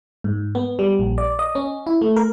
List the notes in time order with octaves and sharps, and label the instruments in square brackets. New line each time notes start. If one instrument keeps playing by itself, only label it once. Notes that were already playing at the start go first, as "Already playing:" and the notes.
[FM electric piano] G#2
B3
G3
A#1
D5
D#5
C#4
E4
A3
A#4